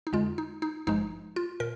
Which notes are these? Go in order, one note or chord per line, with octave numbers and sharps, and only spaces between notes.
D#4
F2 D3 G#3 F4
D#4
D#4
G#1 G2 F3 G#3 D#4
F4
A#2 A#4